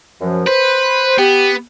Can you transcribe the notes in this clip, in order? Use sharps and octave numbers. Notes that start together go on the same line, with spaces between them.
F#2 F3
B4 C5
B3 G4